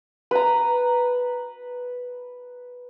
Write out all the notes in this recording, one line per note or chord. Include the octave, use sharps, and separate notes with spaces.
B4 A#5